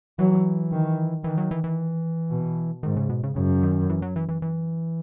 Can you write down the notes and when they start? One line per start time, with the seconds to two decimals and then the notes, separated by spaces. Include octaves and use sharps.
0.19 E3 F#3
0.71 D#3
1.24 D#3 E3
1.38 F#3
1.51 E3
1.64 E3
2.30 B2
2.83 G#2 D#3
2.96 C#3
3.09 B2
3.23 C#3
3.36 F#2 C#3
3.63 D#3
3.90 E3
4.02 F#3
4.16 E3
4.29 E3
4.42 E3